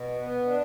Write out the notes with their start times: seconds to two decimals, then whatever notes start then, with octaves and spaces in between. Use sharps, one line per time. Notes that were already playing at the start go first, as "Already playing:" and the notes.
Already playing: B2
0.16 B3
0.45 D4